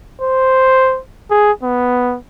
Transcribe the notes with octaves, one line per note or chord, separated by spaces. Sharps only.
C5
G#4
B3